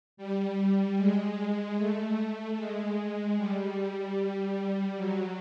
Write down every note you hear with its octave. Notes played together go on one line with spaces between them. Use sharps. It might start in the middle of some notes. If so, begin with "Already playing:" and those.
G3
G#3
A3
G#3
G3
F#3